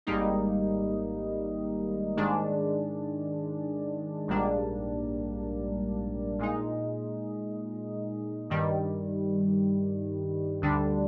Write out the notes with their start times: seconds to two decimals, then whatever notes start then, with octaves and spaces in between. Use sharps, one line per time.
0.07 G#1 G#2 G3 A#3 D#4
2.17 G#2 D#3 G#3 D4
4.28 A#1 G#2 G3 A#3 D4
6.39 A#2 G#3 D#4
8.50 G2 D#3 G3
10.62 D2 D3 G3 D4